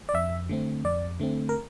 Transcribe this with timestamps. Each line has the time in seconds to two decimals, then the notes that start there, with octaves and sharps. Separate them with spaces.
0.09 D5
0.14 F2 E5
0.49 D3 A3 C4
0.84 F2 D5
1.20 D3 A3 C4
1.49 A#4